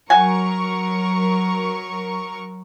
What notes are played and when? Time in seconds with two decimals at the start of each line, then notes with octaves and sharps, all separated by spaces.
0.10 F#3 F#4 A#4 G#5 C#6